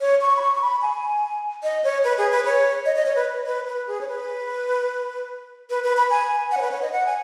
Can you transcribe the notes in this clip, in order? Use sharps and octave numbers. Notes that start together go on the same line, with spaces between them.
C#5
C#6
B5
C#6
C#6
B5
G#5
D#5
C#5
B4
G#4
B4
C#5
D#5
D#5
C#5
B4
B4
B4
G#4
C#5
B4
B4
B4
B5
G#5
F#5
C#5
B4
C#5
D#5
F#5
G#5